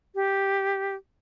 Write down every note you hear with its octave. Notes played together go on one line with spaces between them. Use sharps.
G4